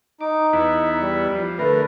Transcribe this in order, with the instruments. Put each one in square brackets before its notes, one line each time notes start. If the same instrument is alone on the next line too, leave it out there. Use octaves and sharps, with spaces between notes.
[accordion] D#4 [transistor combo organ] D6
[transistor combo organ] E2 B3 E4
[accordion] G3
[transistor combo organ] F3
[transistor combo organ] D3 A#4 [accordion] A3 B4